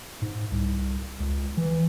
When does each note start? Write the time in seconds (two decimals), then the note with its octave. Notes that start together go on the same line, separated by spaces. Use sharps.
0.22 G#2
0.51 C2
1.20 C#2
1.57 E3